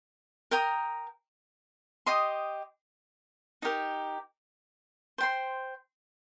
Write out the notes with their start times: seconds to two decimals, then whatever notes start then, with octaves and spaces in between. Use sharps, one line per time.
0.51 A#4 G5 A#5 D#6
2.06 G4 D#5 C6 D#6
3.62 D#4 G4 A#4
5.18 C5 G5 C6